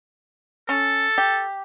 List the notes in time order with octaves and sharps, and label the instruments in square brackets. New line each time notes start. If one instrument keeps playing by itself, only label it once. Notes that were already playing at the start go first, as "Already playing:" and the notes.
[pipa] C#4 [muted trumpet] A4
[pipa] G4